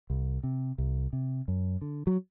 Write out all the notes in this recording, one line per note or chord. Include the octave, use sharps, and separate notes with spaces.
C2
C3
C2
C3
F#2
D3
F#3